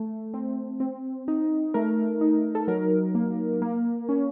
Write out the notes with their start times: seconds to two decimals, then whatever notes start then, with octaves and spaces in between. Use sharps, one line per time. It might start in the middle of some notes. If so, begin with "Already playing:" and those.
Already playing: A3
0.34 C4
0.80 C4
1.28 D#4
1.74 A3 A#4
2.21 D#4
2.55 A4
2.68 F#3 A#4
3.15 A#3
3.62 A#3
4.09 C#4